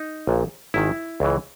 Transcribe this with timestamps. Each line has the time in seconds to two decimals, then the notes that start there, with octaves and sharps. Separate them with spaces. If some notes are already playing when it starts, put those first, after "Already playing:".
Already playing: D#4
0.27 A#1 A#2
0.74 G#1 G#2 D#3 E4
1.20 C#2 C#3 E3